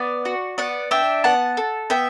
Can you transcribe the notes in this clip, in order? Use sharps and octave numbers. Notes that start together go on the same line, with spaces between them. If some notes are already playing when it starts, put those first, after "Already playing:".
Already playing: B3 D5
F#4
B3 D5 F#5
D4 E5 G5
B3 F#5 A5
A4
B3 E5 G5